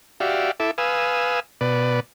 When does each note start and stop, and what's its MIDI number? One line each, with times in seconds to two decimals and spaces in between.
0.20 0.51 66
0.20 0.51 67
0.20 0.51 74
0.20 0.51 76
0.20 0.51 77
0.60 0.71 64
0.60 0.71 69
0.60 0.71 76
0.60 0.71 86
0.78 1.40 71
0.78 1.40 77
0.78 1.40 80
0.78 1.40 87
0.78 1.40 88
1.61 2.00 47
1.61 2.00 71
1.61 2.00 74